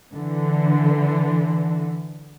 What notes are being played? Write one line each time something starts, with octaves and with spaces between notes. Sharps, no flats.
D3 E3